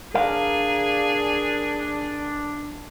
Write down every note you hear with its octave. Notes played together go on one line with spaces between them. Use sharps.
D4 G#4 A#4 F5